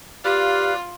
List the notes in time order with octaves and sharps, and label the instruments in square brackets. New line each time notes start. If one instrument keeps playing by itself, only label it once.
[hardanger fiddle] F4 [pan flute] G4 [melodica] B4 D5 F5